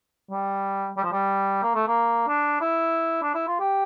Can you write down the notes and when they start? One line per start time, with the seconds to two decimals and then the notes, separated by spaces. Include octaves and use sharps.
0.31 G3
0.97 G3
1.04 F3
1.13 G3
1.63 A#3
1.75 A3
1.88 A#3
2.28 D4
2.61 E4
3.23 D4
3.35 E4
3.48 F4
3.60 G4